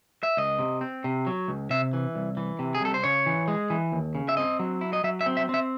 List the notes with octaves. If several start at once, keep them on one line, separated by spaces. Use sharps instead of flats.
E5
C#2 D#5
C3
C4
C3
F#3
C#2
C3 E5
E3
C2
E3
C3
G#4
C2 A4
C5
C#3 C#5
E3
G#3
E3
D#2
C#3
E5
C4 D#5
F#3
E4
D#5
F#3 E5
E5
C4
E5
C4 E5